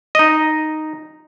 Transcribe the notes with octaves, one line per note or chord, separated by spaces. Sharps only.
D#4 D#5